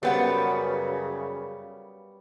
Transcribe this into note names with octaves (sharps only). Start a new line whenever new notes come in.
F#2 C#3 G3 B3 B4 C5 F#5